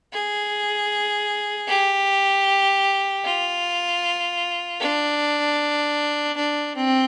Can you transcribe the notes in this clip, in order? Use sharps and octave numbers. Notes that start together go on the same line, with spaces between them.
G#4
G4
F4
D4
D4
C4